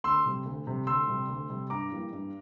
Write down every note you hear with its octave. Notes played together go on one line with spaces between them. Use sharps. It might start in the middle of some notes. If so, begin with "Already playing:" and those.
D2 C6 E6
C3 G3
D2
C3 G3
D2 C6 E6
C3 G3
D2
C3 G3
G2 A#5 D6
E3 G3 A#3
G2